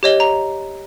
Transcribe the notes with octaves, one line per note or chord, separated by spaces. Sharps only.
G4 C#5 D#5 G7
A#5